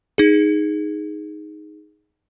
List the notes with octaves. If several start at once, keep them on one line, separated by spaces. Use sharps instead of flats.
D#4 G#4